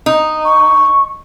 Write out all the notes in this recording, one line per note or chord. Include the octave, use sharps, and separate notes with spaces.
D#4
C#6